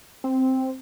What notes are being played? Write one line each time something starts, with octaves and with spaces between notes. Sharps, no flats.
C4